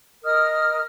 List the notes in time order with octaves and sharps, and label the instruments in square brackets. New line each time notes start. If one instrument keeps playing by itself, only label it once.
[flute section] A#4 D#5 D#6 F6